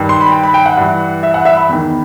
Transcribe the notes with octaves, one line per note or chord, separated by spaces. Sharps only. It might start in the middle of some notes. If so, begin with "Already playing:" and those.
Already playing: G2 D#3
C6
B5
G5
B5
G5
F#5
G2 E3
E5
F#5
E5
B5
E2 D#3